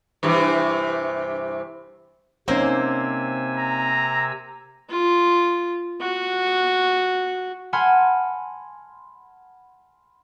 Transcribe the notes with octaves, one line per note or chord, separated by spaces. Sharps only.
G2 C3 E3
C3 A#3 C4 C#4 D#4 C5 G#5 E6
A#5
F4
F#4
F#5 G#5 A5 B5 C6 F6